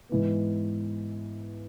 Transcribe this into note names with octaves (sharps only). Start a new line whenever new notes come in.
G#2 E3 B3